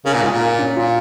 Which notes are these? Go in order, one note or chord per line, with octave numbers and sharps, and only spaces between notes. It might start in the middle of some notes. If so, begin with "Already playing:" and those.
C#3 A#4
A#2
G#2 F4
A#2
A#4
C#4
A#2 F4